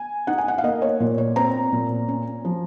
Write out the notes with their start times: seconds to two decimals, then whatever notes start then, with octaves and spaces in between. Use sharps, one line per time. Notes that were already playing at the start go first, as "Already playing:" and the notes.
Already playing: G#5
0.27 D#4 F#5
0.38 G#5
0.48 F#5
0.58 F5
0.64 A#3 D#5
0.82 C#5
1.00 A#2
1.18 C#5
1.36 C4 A#5
1.72 A#2
2.08 C#4
2.45 F3